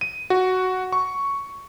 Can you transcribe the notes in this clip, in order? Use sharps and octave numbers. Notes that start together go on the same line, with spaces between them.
D#7
F#4
C#6